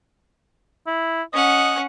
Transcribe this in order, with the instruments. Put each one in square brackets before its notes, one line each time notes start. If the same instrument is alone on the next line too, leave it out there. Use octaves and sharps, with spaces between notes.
[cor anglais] E4
[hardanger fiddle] C#4 F#5 [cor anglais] D#5